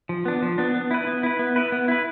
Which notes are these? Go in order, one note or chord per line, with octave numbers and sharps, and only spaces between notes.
F3
B3 D4
F3
B3 D4
B3
E4 B4
B3
E4 B4
B3
E4 B4
B3
E4 B4